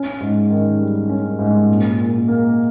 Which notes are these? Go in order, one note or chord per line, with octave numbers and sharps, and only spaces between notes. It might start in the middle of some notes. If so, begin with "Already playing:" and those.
Already playing: C#4
G#2
D#3
G3
C#4
G#2
A#2
A#2
A#3